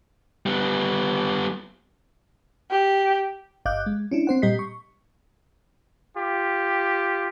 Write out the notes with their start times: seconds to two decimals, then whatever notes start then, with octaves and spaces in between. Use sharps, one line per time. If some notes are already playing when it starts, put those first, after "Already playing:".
0.46 G3 B3
2.71 G4
3.65 G1 D#5 F5 D6 F#6 G6
3.86 G#3
4.11 C#4 D4 E4
4.27 C4 C5 F#5
4.42 A#2 G3 G4 D#5 B6 C7
4.59 C#6
6.14 F4 G4